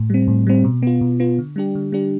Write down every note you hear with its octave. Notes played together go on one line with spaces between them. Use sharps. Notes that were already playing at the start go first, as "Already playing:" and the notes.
Already playing: A2
G3 C4
A2
G3 C4
B2
B3 F4
B2
B3 F4
D3
G3 D4 G4
D3
G3 D4 G4